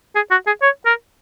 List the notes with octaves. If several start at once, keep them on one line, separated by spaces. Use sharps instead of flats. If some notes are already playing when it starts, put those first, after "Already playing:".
G#4
F#4
G#4
C#5
A#4